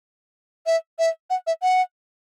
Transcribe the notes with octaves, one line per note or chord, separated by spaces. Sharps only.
E5
E5
F#5
E5
F#5